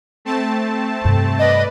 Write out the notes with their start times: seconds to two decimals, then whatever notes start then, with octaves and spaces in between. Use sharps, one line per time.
0.25 A3 C4 A5
1.05 G2 C3
1.39 B4 D5 D#5